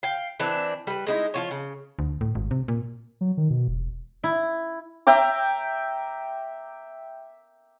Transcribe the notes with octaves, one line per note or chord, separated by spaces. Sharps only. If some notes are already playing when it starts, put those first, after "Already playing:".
F5 G5
E3 C4 D4
G3 B4
G#3 D#4 E4
F3 F4 C#5
C#3
D2
A2
G#1
C3
A#2
F#3
D#3
B2
E1
E4
E5 G5 A#5 D6